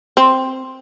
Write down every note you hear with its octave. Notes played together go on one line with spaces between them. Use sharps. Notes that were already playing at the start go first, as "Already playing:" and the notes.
C4